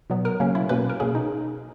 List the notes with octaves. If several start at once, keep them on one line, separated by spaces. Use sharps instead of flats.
B2 F#3 B3
A#4
C#3 F#3 A#3 C#4
E4
B2 A#3 C#4 B4
A#4
B2 A#3 C#4 G#4
D#4